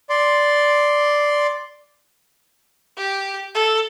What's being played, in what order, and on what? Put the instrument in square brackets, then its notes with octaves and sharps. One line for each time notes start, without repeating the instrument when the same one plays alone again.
[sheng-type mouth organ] D5 C6
[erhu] G4
A4